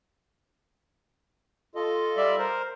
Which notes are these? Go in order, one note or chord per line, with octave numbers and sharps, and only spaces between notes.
F4 A4 D#5
G3 D5 E5
A#4 C5